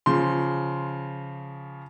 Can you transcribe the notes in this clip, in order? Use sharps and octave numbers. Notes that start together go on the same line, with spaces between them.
C#3 F3 C6